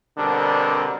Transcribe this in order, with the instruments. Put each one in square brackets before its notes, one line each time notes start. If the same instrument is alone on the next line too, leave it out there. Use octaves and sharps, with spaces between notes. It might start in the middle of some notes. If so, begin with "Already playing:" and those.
[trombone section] B2 D3 G3 C4 D4 A#4